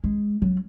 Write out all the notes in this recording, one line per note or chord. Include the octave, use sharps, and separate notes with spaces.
G#3
F#3